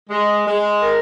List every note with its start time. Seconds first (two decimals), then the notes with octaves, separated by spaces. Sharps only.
0.10 G#3
0.46 G#3
0.82 A#4